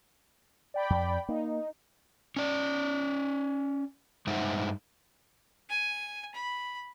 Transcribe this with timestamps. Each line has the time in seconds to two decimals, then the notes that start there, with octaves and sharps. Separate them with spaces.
0.74 D5 G5 B5
0.90 F2
1.29 A#3 D#4
2.36 C#4 D5
4.27 G2 G#3 D#4 C5 E5 F#5
5.69 G#5
6.34 B5